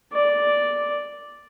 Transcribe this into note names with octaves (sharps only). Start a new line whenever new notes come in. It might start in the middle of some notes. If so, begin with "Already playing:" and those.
D5